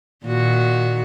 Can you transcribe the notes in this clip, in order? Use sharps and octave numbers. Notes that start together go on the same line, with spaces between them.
A#2 D#3 F#4